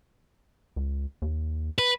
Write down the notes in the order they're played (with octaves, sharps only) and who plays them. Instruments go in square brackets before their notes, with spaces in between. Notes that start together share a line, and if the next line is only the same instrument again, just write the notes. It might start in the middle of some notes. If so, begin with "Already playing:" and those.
[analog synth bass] C#2
D#2
[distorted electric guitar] B4